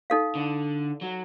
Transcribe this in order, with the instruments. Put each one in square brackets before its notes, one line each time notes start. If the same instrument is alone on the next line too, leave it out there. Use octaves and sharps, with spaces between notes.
[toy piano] D#4 A4 F5
[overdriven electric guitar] D3
F#3